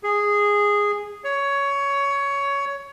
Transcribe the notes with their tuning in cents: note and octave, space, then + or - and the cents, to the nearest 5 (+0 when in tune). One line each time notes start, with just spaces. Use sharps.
G#4 -10
C#5 +15